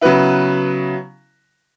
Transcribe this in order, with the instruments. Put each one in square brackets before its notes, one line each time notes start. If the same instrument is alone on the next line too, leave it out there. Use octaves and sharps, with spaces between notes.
[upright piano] C#3 F#3 B3 E4 B4